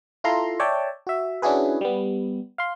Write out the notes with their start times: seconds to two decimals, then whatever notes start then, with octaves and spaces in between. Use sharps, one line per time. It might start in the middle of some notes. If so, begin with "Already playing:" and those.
0.24 E4 F4 A4 A#5 C6
0.60 C#5 D5 E5 G5 A5
1.07 F#4 E5
1.42 C#4 D4 E4 F#4 G#4 B4
1.81 G3 B3
2.58 F5 C6